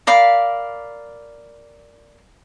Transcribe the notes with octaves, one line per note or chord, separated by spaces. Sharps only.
A#4 D5 F5 B5